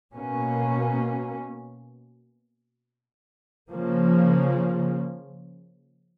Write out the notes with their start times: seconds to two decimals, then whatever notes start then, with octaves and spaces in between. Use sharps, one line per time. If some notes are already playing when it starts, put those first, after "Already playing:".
0.13 B2 A#3 C#4
3.71 C#3 F3 A#3